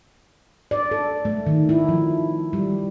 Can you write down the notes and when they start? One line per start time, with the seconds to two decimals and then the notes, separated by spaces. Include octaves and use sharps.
0.71 D5
0.91 A4
1.25 A3
1.46 D#3
1.69 E4
1.89 F3
2.53 G3